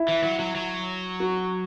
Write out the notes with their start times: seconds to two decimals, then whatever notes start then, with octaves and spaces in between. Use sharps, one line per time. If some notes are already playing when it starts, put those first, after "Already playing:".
Already playing: E4
0.08 E3
0.23 F#3
0.40 F#3
0.55 F#3
1.20 F#4